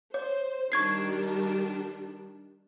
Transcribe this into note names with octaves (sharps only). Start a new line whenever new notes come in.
C5 C#5
D#3 G3 D4 C#6 G#6 C7